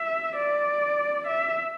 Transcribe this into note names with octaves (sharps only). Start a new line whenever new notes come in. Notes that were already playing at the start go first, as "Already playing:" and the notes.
Already playing: E5
D5
E5